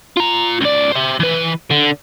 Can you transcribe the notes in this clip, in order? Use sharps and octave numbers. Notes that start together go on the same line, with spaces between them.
F4 A#5
C#2 D5
C5 E5
E3 B4
D3